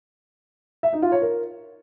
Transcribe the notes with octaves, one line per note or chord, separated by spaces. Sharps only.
E5
D#4
F4
C#5
A#4